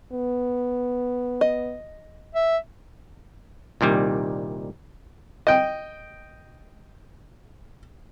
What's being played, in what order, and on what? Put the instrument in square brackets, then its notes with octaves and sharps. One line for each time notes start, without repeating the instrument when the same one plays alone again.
[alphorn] B3
[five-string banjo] D#5
[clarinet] E5
[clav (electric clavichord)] C2 A#2 D#3 G3
[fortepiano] D#5 G5